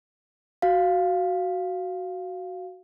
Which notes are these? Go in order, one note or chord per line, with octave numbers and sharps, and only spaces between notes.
F#4 F5